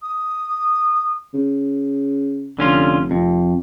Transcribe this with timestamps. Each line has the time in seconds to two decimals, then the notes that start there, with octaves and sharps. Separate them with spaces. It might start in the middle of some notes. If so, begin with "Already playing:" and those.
0.02 D#6
1.34 C#3
2.59 F1 D3 C#4 F4
3.11 F2